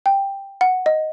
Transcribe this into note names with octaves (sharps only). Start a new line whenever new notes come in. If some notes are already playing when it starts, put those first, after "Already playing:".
G5
F#5
D#5